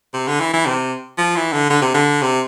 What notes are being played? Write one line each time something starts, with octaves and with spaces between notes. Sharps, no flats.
C3
D3
E3
E3
C3
F3
E3
D3
D3
C3
D3
C3